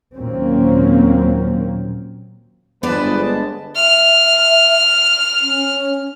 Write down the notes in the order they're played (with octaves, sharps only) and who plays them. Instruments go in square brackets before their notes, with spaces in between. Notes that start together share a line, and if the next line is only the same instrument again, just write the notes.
[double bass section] D#2 A#2 F#3 A#3 C4 C#4
[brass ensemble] G1 G#3 A5 [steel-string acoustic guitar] B3 C5 D5 [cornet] B4
[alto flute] E5 [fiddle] F6
[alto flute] C#4